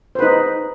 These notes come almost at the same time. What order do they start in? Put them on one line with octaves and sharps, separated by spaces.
C5 B4 D#4